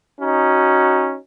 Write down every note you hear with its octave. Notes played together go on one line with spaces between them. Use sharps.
C#4 D#4 F#4